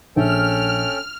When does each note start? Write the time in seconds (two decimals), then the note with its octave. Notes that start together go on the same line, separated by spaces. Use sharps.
0.16 A#1 C#4 A4 G5 F6